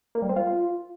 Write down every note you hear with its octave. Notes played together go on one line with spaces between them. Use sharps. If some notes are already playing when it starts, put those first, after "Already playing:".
A#3
G3
C4
F4